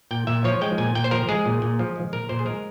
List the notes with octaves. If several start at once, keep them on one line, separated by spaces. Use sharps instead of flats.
A#2 G5
A#2 E5
F3 C#5
G#3 G5
A#2 G#5
A#2 G5
C5
F3 A#4
G#3 G#4
A#2
A#2
F3
G#3
A#2 A#4
A#2 C5
G#4
G#3 A#4